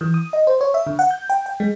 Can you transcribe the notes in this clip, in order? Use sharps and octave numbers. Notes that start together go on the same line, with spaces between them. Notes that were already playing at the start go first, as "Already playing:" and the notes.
E3
D#6
D#5
C5
C#5
E5
D3
F#5
G6
G5
G5
G#3